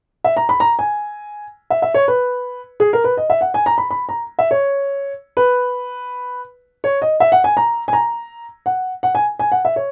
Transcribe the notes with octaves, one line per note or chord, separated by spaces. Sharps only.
E5
A#5
B5
A#5
G#5
E5
E5
C#5
B4
G#4
A#4
B4
D#5
E5
F#5
G#5
A#5
B5
B5
A#5
E5
C#5
B4
C#5
D#5
E5
F#5
G#5
A#5
G#5
A#5
F#5
F#5
G#5
G#5
F#5
E5
C#5